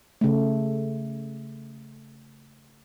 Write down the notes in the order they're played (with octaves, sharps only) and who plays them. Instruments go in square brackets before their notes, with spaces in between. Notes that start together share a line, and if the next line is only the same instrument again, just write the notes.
[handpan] C#3 A3